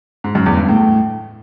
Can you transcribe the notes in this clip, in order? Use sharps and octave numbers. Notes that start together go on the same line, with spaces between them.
G#2
F#2
E2
G2
A2